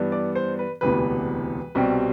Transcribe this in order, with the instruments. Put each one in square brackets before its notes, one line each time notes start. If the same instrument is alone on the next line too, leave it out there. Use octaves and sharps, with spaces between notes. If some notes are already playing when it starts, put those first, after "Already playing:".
Already playing: [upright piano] G2 E3 B3 D4
D5
C5
B4
E1 D2 C3 E3 B3 B4
C2 B2 G3 C4